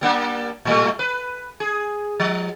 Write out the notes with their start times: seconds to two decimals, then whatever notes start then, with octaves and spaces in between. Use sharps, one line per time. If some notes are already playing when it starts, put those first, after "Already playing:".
0.01 G3 A#3 D4
0.65 A2 G3 A3
0.99 B4
1.60 G#4
2.20 F3